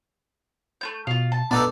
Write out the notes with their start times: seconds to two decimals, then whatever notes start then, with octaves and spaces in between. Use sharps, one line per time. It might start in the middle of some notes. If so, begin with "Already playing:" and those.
0.81 A3 B3 G6
1.07 B2 F4 F5
1.32 A5
1.51 B3 D4 D#4 A4 B4 D6 A6